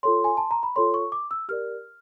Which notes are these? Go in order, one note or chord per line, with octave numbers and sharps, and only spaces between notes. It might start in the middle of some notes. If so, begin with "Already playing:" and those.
F4 A4 C#5 C6
G#5
A5
A#5
B5
F4 A4 C#5 C6
C#6
D6
E6
G4 A#4 D5 F6